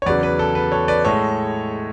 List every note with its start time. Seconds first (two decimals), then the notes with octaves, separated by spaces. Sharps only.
0.02 C#5
0.06 E2 C#3 F#3 B4 D5
0.23 B4
0.39 A4
0.55 B4
0.72 A4 C#5
0.88 B4 D5
1.05 A2 G#3 A4 C#5